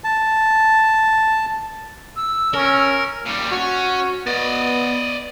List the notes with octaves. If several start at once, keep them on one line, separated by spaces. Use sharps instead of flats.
A5
E6
C#4 A#4
A#2 G3
C#4 F#4
B3 D5 D#5